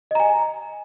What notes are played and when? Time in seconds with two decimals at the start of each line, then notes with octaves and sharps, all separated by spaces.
0.11 D#5
0.15 A#5
0.20 G#5